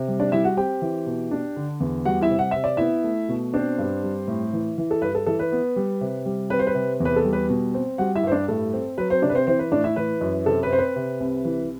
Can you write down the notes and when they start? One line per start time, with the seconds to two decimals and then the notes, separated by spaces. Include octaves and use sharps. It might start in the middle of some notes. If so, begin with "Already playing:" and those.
Already playing: C3
0.08 G3
0.20 D4 D5
0.32 G3 E4 E5
0.44 F#4 F#5
0.57 C4 G4 G5
0.82 E3
1.06 B2
1.31 D4
1.57 D3
1.80 E2
2.05 G3 F#4 F#5
2.21 E4 E5
2.30 C3
2.39 F#5
2.51 C3 E5
2.64 D5
2.77 B3 E4 E5
3.04 A3
3.28 B2
3.53 C4 D4 C5
3.79 G2
4.03 G3
4.28 A2
4.53 E3
4.78 E3
4.91 A4
5.02 G2 B4
5.15 A4
5.26 E3 A4
5.39 B4
5.52 B3
5.76 G3
6.01 C3
6.26 G3
6.50 C4 B4
6.59 C5
6.67 B4
6.75 C3
7.00 E2
7.05 B4
7.16 A4
7.25 G3
7.33 B4
7.49 B2
7.74 C4
7.98 G3 F#4 F#5
8.16 E4 E5
8.23 G2 C5
8.32 D4 D5
8.48 A2 A4
8.73 C4
8.98 F#3 B4
9.10 C4 C5
9.22 C3 D4 D5
9.30 B4
9.35 C4 C5
9.47 E3 C4 C5
9.59 B4
9.72 A2 D4 D5
9.84 E4 E5
9.96 E3 B4
10.21 F#2
10.46 C3 A4
10.63 B4
10.70 C4 C5
10.79 B4
10.96 C3
11.20 C2
11.45 E3